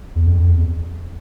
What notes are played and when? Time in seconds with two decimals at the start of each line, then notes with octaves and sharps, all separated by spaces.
0.16 E2
0.27 F2
0.39 F2
0.52 E2